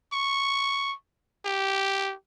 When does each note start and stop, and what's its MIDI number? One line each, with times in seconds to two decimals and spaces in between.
0.13 0.94 85
1.46 2.14 67